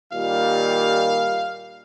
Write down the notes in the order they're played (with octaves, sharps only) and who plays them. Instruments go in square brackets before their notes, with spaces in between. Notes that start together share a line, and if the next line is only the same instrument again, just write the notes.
[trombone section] A#2 D#3 G3 [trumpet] F5